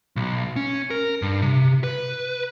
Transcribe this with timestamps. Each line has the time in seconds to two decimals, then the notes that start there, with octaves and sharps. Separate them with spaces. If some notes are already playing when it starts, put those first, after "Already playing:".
0.16 B1
0.56 C#4
0.90 A#4
1.22 G2
1.42 C3
1.84 B4